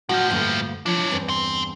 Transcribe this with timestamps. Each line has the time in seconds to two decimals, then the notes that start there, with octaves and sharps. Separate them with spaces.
0.09 A2 F3 F#4 F#5
0.30 D2 G2 A#3
0.86 F3 D4 C#5
1.11 E2 G2 C4
1.29 G5 C6